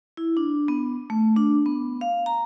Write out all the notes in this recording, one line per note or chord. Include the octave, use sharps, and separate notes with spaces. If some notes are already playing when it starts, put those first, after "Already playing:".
E4
D4
B3
A3
D4
B3
F5
A#5